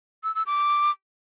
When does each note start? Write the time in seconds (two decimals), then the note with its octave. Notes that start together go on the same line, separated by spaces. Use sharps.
0.24 E6
0.35 E6
0.46 D6